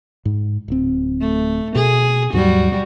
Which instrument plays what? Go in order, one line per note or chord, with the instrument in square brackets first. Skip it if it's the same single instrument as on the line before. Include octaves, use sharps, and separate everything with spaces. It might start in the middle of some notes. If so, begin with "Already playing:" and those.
[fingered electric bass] G#2
D1 C4
[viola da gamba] A3
[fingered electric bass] B2 [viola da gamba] G#4
[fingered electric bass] D#2 G#2 F#3 [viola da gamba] G3 F#4